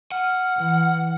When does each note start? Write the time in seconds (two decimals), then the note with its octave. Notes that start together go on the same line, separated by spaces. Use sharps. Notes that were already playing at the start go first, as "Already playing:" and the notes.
0.12 F#5 F6
0.58 E3